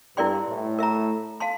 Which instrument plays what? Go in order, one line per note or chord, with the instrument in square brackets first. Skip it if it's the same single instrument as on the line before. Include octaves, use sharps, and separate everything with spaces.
[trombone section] G2 [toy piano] E4 A#4 D5 G5 C6
[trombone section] A2
[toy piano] A#4 E5 A#5
F5 A5 C6